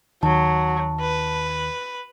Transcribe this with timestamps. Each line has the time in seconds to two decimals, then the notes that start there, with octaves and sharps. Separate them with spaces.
0.23 D#2 D#3 F#3 A5
1.01 B4